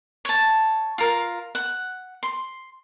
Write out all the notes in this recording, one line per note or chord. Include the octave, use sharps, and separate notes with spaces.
C#5 A5
F4 A#4 F5
F#5
C6